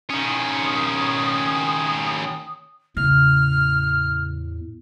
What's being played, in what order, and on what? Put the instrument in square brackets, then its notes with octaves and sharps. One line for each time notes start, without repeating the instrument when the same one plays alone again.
[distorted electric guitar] D#3 C#4 [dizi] D#6
[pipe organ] E2 A2 [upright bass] C#3 [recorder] F6